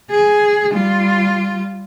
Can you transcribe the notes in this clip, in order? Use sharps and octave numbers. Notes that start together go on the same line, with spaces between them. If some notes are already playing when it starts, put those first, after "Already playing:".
G#4
G3 F4